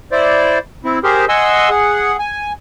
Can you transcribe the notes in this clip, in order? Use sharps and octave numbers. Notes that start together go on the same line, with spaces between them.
E4 C5 D5
C4 E4
G4 G#4 A#4 C5
D#5 F#5 G#5 C6 E6
G#4 F#5
G#5